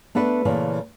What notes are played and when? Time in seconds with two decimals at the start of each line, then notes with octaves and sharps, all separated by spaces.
0.15 A3 B3 D4 A4 B4
0.45 A#2 C#3 E3 A3 A#3